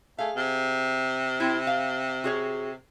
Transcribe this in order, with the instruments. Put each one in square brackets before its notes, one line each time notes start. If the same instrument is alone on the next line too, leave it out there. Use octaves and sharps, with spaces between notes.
[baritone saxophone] A3 [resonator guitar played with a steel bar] G#4 F5
[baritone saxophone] C3
[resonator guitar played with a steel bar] C4 E4
F5
F#4 G#4 C#5